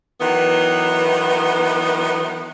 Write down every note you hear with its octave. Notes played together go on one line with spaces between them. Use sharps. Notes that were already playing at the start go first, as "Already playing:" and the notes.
D#3 E3 F#3 B3